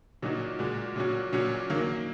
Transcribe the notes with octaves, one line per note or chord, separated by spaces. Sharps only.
A#2 F#3 D#4 F#4
A#2 G#3 F#4
A#2 F#3 C#4 F#4
A#2 F#3 C#4 F#4
D#3 F#3 A#3